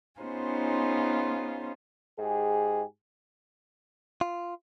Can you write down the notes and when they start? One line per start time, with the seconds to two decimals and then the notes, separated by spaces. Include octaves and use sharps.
0.20 B3 C#4 D#4 F4 G#4 C5
2.19 G#2 G4 G#4
4.21 F4